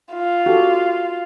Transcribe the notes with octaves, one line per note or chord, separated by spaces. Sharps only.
F4
F#4 G4 A4